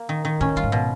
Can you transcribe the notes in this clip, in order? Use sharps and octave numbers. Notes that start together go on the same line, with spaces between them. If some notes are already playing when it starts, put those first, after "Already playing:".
Already playing: A#3
D#3
D#3
A2 C#4
G#2
G2 F4
G#2
B2